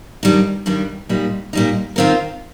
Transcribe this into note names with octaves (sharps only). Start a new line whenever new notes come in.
G2 D#3 G3 D#4
G2 D#3 G3 D#4
A#2 G3 D#4
A#2 G3 D#4
D#3 C4 F4 A#4